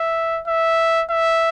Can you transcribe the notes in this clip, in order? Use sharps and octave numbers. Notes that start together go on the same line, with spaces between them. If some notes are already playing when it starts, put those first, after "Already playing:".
Already playing: E5
E5
E5